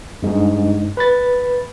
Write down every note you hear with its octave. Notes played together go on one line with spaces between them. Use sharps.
G2 G#3 D4 D#4
B4 B5 A6